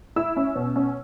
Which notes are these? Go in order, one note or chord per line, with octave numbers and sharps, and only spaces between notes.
E4 E6
C#4
B2
C#4